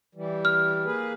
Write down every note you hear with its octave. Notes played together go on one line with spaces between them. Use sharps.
E3 G3
F6
A#3 G#4 B4